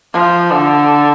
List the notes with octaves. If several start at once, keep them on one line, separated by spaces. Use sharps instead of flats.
F3
D3